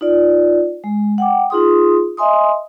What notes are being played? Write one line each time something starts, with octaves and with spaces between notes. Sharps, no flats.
D#4 F4 D5
G#3
F#5 G5 D6
D#4 F4 G#4 C6 D#6
D#5 E5 G#5 C6 D#6